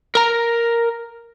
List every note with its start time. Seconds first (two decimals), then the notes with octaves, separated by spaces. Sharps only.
0.15 A#4 A#5